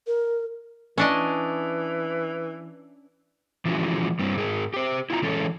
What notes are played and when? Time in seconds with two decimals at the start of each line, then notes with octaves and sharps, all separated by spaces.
0.07 A#4
0.98 E3 C#4 D4 D#5
3.65 E3 F3 G#3 C#4 E4 F#4
4.19 G2 G3 C4
4.36 G#2 G#4 A#4
4.74 G4 C5
5.10 E4 F4 G5 A#5
5.23 E3 G#3 C#4 A4